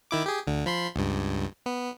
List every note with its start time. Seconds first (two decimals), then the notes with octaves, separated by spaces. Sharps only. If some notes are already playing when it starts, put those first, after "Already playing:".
0.11 D#3 E4 D6
0.26 G4 G#4
0.47 D2 D3
0.66 F3 B5 C6
0.96 C#2 G2
1.66 B3